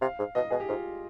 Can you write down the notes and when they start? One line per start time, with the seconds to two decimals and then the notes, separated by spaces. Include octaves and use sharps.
0.01 C3 F5
0.19 G#2
0.35 B2 D#5
0.50 B2 G#4
0.60 G4
0.69 G#2 F4